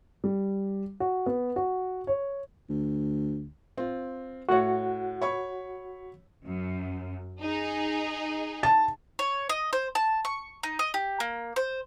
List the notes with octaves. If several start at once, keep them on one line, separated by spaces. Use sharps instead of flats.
G3
F#4
B3
F#4
C#5
D2
C4 F4
A2 F#4 C#5 F#5
C#5 B5 C#6
F#2
D#4 G#4
A5
C#5
D#5
C5
A5
C#6
D#4
D#5
G4
A#3
C5